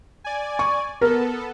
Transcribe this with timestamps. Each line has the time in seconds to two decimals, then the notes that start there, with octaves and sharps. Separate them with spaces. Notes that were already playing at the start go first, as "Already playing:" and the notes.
0.24 D5 G#5
0.59 C#6
1.01 B3 A4 A#4